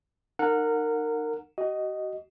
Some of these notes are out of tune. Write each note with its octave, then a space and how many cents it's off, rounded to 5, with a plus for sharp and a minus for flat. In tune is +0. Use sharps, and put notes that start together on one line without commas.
D#4 -30 A#4 -20 F#5 -20
F#4 +40 D#5 +0